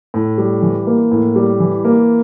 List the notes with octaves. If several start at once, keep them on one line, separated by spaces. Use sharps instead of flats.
A2
G3
E3
A#3
A2
G3
E3
A#3